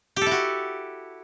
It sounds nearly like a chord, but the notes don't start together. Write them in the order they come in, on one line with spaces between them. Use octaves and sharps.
G4 A4 E4 F#4